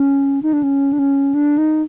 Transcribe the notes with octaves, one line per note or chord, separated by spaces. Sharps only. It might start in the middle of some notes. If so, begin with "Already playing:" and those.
Already playing: C#4
D#4
D4
C#4
D4
C#4
D4
D#4